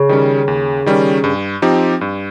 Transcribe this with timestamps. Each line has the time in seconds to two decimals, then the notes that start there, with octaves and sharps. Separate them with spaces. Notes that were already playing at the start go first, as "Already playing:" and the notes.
Already playing: C#3
0.09 D#3 G3 C#4
0.48 D#2
0.86 D#3 G3 C#4
1.24 G2
1.62 F3 C4 D#4 G4
2.01 G2